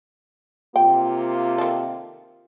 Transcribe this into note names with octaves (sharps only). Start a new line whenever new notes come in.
C3 A#3 F4 G5
D#3 A4